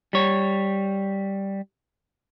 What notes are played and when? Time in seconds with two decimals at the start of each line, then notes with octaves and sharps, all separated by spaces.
0.13 G3 C#5